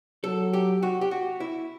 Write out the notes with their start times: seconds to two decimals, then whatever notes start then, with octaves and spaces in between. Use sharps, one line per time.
0.24 F#3 A4
0.53 G4
0.83 F#4
1.01 G4
1.11 F#4
1.40 E4